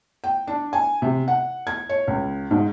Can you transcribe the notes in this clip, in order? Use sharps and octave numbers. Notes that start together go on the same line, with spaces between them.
G5
D4
G#5
C3
F#5
G#6
C#5
C#2
G#2